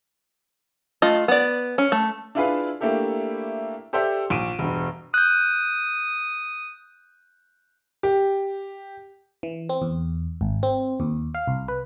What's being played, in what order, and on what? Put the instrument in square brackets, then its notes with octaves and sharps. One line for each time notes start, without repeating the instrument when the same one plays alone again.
[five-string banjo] A3 F4 D#5
B3 D5
C#4
A3
[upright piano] D4 E4 F4 G#4 B4 F5
A3 A#3 D4 E4 G4 A4
G4 A4 C5 D5 E5 G5
A#1 D7 D#7
E1 G2
[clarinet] D#6 [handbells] F#6 G6
[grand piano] G4
[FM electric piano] E3
C4
E2
G#1
C4
D#2
F5
C2
B4